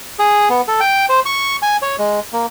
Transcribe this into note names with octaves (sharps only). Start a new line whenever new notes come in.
G#4
B3
A4
G5
C5
C#6
G#5
C#5
G#3
A#3